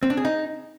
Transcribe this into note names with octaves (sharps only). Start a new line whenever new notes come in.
C4
D4
G#4
D#4